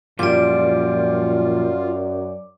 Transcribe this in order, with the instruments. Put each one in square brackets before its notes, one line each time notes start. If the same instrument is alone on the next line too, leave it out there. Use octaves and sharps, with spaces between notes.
[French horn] F#2 [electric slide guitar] A#2 F3 G3 [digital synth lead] F4 [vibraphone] D5 D6